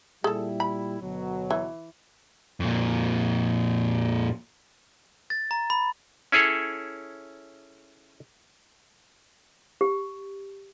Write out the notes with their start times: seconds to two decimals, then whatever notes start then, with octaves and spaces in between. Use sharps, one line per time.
0.24 A#2 G3 E4 G#4 A4
0.60 B5
1.01 D2 B2 F#3
1.51 E3
2.60 F2 A#2
5.30 A6
5.51 A#5
5.70 B5
6.32 C#4 E4 G#4 A4 C#5
9.81 G4